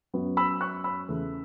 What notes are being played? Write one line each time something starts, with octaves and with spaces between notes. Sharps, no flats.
F#2 F#3 B3
B5 E6
C#6 F#6
B5 E6
E2 C#3 A3